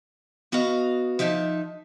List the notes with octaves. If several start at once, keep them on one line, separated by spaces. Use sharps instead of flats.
B3 F#4 D#5 F5
F3 D#4 E5 G#5 A5